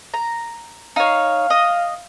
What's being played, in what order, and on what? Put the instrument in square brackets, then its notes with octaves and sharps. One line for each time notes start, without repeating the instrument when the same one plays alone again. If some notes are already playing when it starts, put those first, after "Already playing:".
[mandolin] A#5
[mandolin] D#4 C#5 [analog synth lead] F5
[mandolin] D#5